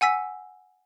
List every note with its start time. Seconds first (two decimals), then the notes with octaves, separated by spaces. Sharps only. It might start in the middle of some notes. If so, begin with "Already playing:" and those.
0.01 F#5 G#5 E6 B6